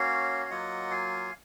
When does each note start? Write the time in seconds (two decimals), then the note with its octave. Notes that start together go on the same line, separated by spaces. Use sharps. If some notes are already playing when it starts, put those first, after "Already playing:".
Already playing: A#3 C#4 F#4 C#5 F5
0.45 F5
0.50 F#3 A#3 F4 D#5 F#5
0.91 F5 G#5